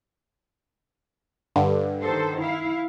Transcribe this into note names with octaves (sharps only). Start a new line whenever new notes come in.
G2 D3
D#3 A4 C5
E4 F5